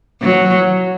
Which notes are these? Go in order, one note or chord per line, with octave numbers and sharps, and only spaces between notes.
F#3